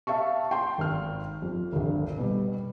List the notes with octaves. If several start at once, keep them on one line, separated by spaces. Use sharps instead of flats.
E5 F5 A5 C#6
G5 C6
G#1 F6
F2
G#1 D2
B2 G3